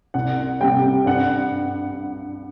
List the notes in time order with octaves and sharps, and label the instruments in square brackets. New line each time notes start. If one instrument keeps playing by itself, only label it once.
[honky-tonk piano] C2 F#5
C3 G3 G5
G2 F#5